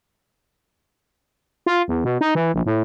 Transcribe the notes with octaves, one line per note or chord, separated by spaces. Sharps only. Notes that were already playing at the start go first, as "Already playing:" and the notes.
F4
E2
B2
D#4
E3
A#1
A2